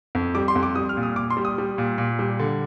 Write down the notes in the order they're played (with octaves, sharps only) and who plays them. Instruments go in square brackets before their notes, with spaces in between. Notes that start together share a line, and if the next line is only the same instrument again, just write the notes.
[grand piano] F2
G3 D6
C6
F2
D6
G3 D#6
F6
A#2
D#6
A#2 D6
C6
G3
D#6
G3
A#2
A#2
G3
D3